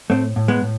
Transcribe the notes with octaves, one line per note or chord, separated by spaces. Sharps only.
A2 A3 C4
A2
G#3 B3
A2